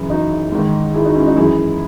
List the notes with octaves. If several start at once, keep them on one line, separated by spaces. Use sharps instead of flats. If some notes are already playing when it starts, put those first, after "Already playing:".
Already playing: F#2 C#3 E3 E4
D#4 F#4
G#2 D#3
E4 G#4
D#4 F#4
C#4 E4
D#4 F#4
F#2 E3 E4 G#4